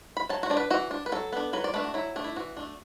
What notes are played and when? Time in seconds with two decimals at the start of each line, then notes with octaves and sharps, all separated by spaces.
0.17 B5
0.29 F#3 A5
0.43 F#4
0.50 D4 D5
0.57 B4
0.70 E3 F#4
0.91 D4
1.06 B4
1.12 F#3 A4
1.33 B3 D4
1.53 F#3 B4
1.64 D5
1.74 A3 D4 B4
1.84 F#4
1.94 F#3 E4
2.16 A3 D4
2.24 E4
2.36 E3 F#4
2.57 A3 D4